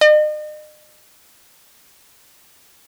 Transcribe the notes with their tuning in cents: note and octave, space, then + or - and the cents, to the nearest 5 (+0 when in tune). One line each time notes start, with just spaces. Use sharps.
D#5 -40